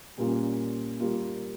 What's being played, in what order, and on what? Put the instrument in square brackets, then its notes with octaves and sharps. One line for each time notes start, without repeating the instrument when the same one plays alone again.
[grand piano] A#2 G3 A#3 C#4 F4
G3 A#3 F4